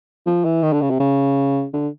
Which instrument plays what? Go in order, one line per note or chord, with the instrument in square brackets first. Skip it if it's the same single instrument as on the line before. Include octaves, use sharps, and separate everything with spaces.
[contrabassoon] F3
E3
D#3
D3
C#3
C3
C#3
D3